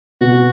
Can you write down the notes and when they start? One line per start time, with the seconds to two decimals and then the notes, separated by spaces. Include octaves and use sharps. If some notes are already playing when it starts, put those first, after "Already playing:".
0.21 B2 F#4